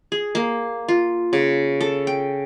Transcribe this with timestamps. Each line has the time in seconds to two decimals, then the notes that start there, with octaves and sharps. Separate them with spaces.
0.12 G#4
0.35 A#3
0.88 F4
1.33 C#3
1.81 A4
2.07 G5